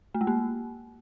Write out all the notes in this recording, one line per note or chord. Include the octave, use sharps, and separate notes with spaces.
A3
G#3
A#3